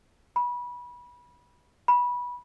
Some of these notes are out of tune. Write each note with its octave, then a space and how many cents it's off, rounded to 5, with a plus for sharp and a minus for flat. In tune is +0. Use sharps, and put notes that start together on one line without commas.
B5 -25
B5 -20